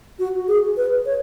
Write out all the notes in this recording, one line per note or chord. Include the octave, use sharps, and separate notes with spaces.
F#4
G#4
B4
C#5